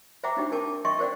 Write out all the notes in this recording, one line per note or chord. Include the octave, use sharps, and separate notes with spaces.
C5 E5 F#5 G5 A#5 D6
D4 D#4 G4 G5
A#4 G5 A5 D6
D#5 E5 G5 C6 C#6
A#4 C5 D5 F#5 G5